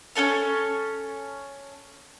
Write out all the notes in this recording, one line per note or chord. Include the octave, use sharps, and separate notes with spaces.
C#4 D4 A4 C#5